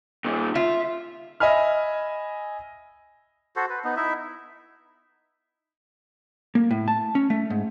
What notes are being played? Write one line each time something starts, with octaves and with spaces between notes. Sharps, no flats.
A#2 D#3
F4 E5
D#5 E5 G#5 B5 F6
F#4 A4 C5
B4
B3 D#4
D#4 E4 E5
A#3
A2
A5
C#4
A3
G#2